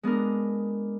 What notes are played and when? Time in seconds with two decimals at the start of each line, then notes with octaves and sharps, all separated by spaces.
0.03 G#3 B3 D4 A#4